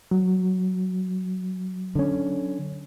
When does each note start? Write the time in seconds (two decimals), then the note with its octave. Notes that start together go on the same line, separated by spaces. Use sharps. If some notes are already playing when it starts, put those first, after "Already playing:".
0.11 F#3
1.95 D3 C#4